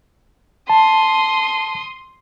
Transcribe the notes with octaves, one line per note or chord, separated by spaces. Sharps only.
A5 C6 D#6